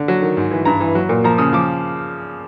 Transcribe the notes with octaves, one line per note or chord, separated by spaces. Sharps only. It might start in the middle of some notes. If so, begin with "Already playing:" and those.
Already playing: D3
F#3
D#3
G#2
E3
G2 A#5
E3
F#3
A#2
F3 A#5
C#3 D#6
F3 D6